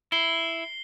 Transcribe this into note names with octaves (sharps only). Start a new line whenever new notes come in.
E4 C7 G7